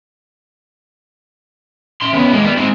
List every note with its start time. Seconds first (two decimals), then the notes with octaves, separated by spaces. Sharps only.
2.01 E5 C6
2.13 C#3 B3
2.33 G#3 A#3
2.45 G3 B3
2.57 G#3 C4